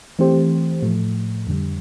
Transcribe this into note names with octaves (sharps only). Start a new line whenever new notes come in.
E3 A3 C4 G4 C5
A2 F3 A3
F2 D3 G3